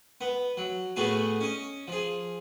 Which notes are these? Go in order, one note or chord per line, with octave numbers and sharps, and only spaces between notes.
B3
F#3
A2 A3 B3 F#4 G#4
C#4 D#5
F3 G#4